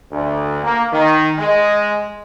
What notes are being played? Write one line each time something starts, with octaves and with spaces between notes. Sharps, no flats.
D2
A#3
D#3
G#3